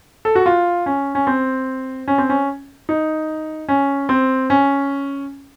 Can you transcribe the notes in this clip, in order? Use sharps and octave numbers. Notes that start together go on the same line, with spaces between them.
A4
F#4
F4
C#4
C#4
C4
C#4
C4
C#4
D#4
C#4
C4
C#4